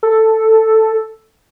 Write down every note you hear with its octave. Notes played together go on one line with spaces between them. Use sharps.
A4